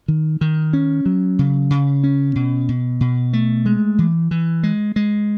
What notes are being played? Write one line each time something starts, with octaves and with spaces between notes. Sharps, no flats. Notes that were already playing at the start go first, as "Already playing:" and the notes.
D#3
D#3
C#4
F#3
C#3
C#3
C#4
B2
B2
B2
A3
G#3
E3
E3
G#3
G#3